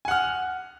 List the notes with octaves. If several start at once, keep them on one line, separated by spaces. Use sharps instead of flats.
F#5 G#5 F6